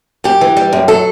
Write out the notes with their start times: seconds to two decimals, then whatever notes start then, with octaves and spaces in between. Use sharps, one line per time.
0.24 F#2 G4
0.41 E3
0.57 G3
0.73 F#2
0.88 F#3 A4